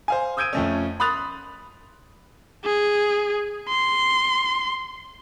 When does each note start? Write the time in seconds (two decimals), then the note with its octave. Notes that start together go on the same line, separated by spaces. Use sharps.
0.08 C5 F5 G#5
0.37 D#6 E6 G6 G#6 D7 D#7
0.53 F2 A3 C#4
1.00 B5 C6 D#6 F#6 A6 F7
2.65 G#4
3.69 C6